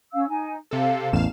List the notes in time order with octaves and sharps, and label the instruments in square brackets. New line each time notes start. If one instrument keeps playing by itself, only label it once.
[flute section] C#4 F5 E6
D#4 G#5
[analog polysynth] C3 A4 [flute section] F5
[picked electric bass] A1 E2 [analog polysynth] F5 E7